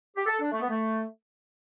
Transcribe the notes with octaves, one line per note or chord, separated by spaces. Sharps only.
G4
A4
D4
A3
B3
A3